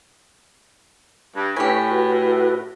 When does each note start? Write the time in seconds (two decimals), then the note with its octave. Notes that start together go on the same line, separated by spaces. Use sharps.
1.35 G2
1.56 A2 G4 B4 C#5 G#5 B5
1.91 F#4 B4